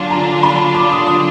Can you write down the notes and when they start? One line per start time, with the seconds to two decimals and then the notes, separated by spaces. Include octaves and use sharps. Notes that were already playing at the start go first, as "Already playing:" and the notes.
Already playing: D3 F#3 D4 F4 G#5
0.11 A#5
0.43 B5
0.74 D6
0.92 D#6
1.07 D#6